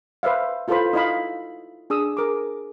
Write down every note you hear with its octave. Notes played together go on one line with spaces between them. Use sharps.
B4 C5 E5 F5
E4 F4 A4 B4 C5 B5
D#4 E4 D#5 F5 B5
D4 G#4 D#6 E6
G#4 A#4 D6